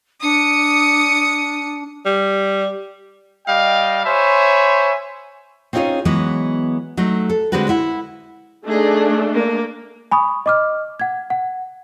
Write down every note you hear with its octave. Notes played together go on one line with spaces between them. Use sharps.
D4 D#6 C#7
G3
G3 D#5 F5 G5
C5 C#5 E5 G#5 B5
C4 C#4 D#4 F4 G#4 C#5
E3 F#3 G#3 B3
F#3 A3 D#4
A4
D3 G3 G#3 C4 F#4 B4
E4 F#5
A3 D4 D#4 G#4
A#3
G#5 B5 C#6 D#6
D#5 D6 F6
F#5 G#6
F#5